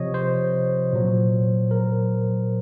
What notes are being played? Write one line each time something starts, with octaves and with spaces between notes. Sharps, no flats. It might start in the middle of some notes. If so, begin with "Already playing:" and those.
Already playing: C3 F3 C#5 D#5
C5
A#2 F#3
A#4